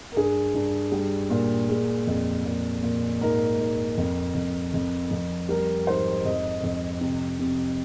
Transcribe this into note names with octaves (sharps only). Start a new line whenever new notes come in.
A#4
G2 G#4
G2
G3
A#2
G#3
F2
A#2
A#2
G#2 A#4
G#2
F2
F2
F2
F2
G3 A#4
G#2 C5
F2 D#5
F2
C3
C3